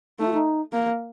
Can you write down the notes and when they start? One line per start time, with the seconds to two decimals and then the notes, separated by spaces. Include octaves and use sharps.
0.19 A3 D#4
0.27 F4
0.34 D#4
0.72 A#3